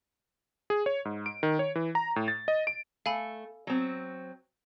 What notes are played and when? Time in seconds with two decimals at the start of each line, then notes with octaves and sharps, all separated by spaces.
0.70 G#4
0.86 C#5
1.05 G#2
1.26 D7
1.43 D#3
1.59 C#5
1.75 E3
1.95 A#5
2.16 A2
2.28 A6
2.48 D#5
2.67 D7
3.06 A3 F5 G#5 B5
3.67 F#3 C4